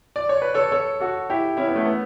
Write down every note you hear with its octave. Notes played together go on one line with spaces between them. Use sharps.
D5
C#5
B4
A4 C#5
A4 C#5
F#4 A4
E4 G4
C#4 E4
B3
A3
B3